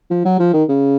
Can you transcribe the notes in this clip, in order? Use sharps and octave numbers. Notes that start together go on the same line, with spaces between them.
F3
F#3
F3
D#3
C#3